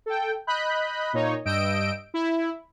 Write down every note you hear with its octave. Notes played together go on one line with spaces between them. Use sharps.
A4 G5
D#5 B5 F#6 G6
A#2 D#4 C#5
G2 D#5 E6 G6 D7
E4